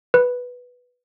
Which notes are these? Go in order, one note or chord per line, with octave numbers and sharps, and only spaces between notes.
B4